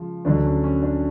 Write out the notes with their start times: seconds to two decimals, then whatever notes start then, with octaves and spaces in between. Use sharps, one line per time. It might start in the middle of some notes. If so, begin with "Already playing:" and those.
Already playing: C#3 F3 G#3
0.25 D2 D3 F#3 D4
0.44 C#4
0.64 C#4
0.82 D4